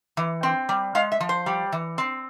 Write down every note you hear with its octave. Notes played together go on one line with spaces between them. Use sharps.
E3
C4
G3
G#3 F5
E5
F3
C5
G3
E3
C4